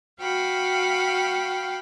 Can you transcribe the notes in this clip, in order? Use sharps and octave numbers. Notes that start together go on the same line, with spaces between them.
F#4 F5 G5 B5